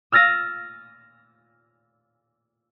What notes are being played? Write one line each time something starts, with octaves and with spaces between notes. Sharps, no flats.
E6 F6 A6 A#6 D#7